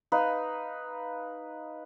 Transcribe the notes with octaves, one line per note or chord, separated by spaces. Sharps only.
D#4 B4 F5